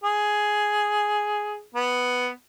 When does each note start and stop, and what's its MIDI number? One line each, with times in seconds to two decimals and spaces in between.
0.04 1.61 68
1.75 2.30 59